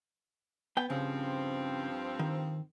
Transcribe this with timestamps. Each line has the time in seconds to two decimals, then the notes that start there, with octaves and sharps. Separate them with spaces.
0.77 B3 G5
0.90 G2 C#3 F3 C4
2.19 D#3